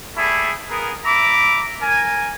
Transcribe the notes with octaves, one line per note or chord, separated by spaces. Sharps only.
G3 A3 E4 G#4
B3 G#4 A#4
E5 A#5 B5 D6
A#4 G#5